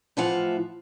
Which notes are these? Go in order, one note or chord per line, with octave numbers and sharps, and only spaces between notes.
A2 E3 F3 E4 F5 F#5